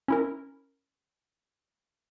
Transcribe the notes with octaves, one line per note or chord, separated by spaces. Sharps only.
C#4 E4 A#4